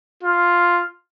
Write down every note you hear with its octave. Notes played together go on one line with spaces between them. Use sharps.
F4